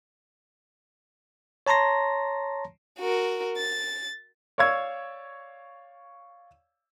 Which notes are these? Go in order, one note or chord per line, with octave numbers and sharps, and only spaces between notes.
C#5 A5 A#5 C6 A#6
F#4 A#4
A6
C#5 D5 F5 C#6 E6 G#6